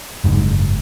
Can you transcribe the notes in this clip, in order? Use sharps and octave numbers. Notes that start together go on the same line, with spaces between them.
F#1 G#2